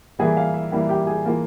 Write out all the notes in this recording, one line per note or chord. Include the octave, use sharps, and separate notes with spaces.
E3 G3 A#3 E4 G#4 G#5
F5
E5
E3 G3 A#3 E4
G4 G5
G#4 G#5
E3 A#3 F4